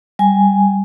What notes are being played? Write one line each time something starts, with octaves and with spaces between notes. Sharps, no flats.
G3 G#5